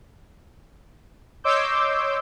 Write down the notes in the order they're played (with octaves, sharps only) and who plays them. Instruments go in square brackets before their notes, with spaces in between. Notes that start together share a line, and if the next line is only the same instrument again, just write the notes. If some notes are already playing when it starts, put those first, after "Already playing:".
[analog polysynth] C#5 D#5 C6 D6 E6 G6